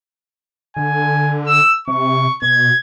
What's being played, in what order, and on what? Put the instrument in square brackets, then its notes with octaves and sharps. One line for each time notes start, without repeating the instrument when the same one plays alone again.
[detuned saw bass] D3 [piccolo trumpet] G#5
[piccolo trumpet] E6
[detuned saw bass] C3 [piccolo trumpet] C#6
[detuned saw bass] B2 [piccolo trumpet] G#6